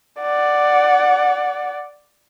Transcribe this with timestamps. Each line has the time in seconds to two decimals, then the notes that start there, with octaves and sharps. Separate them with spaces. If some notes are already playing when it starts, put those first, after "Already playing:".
0.22 D5 F#5